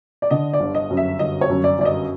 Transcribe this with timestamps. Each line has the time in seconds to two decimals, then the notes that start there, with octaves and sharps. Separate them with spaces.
0.22 D5
0.30 D3 D#5
0.53 D5
0.60 G1
0.75 D#5
0.90 F#2
0.97 E5
1.19 G1 D#5
1.41 C#5
1.49 F#2
1.64 D5
1.79 G1 D5
1.85 D#5